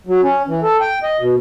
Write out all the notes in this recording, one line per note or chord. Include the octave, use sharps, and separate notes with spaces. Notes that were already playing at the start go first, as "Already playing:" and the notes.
F#3
C#4
E3
A4
G5
D#5
B2